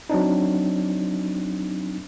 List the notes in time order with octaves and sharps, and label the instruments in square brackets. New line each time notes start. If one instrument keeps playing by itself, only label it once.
[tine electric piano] F#3 C4 D4 D#4